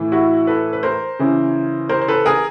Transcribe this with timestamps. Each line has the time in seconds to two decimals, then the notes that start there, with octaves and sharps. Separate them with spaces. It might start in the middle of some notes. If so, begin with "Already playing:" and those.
Already playing: A2 E3
0.12 E4 F#4
0.47 A4 B4
0.73 B4
0.83 A#4 C5
1.19 C#3 E3
1.89 A#4 C5
2.02 C5
2.08 A4 B4
2.26 G#4 A#4